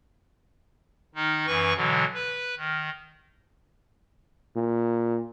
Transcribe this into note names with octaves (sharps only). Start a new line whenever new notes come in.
D#3 D#4
F#2 E3 B4 C#6
B2 D3 E3 F#3
B4
D#3
A#2